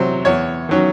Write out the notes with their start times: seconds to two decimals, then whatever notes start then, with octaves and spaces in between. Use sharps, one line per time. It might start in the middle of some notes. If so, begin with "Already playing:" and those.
Already playing: E2 C3 F#3 C5
0.25 E2 C#5
0.69 D#3 F#3 C#4